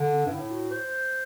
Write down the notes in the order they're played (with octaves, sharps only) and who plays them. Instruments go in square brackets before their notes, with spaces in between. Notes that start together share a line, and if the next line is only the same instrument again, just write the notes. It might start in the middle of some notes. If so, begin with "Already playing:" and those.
Already playing: [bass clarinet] D3
[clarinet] C4
[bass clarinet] G2
[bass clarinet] A2 [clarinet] E4
[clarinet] F#4
C5